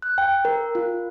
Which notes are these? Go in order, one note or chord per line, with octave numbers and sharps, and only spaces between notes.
F#6
G5
A#4
F4